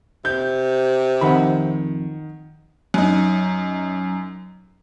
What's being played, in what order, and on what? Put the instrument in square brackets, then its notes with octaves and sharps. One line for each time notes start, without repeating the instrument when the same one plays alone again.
[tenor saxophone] C3 [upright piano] G6
[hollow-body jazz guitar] F2 B5 [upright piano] D#3 F#5
[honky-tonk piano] F#2 D#4